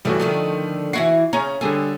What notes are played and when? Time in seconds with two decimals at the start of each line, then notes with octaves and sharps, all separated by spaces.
0.05 G2 C#3 E3 G3 A3 F#4
0.20 D3 D#3 F3 A3
0.93 E3 E4 F#4 C7
1.33 C#3 C#4 A#5
1.61 D3 G3 G#4 A4